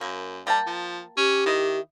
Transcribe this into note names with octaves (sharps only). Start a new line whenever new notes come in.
F#2 A#3
G3 A#3 G5 A5
F3
C#4 G4
D#3 E4 D#5